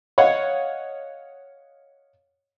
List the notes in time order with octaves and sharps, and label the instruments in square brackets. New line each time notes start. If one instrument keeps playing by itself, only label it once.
[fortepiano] C#5 D#5 F5 F#5